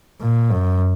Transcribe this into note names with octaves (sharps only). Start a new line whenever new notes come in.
A#2
F#2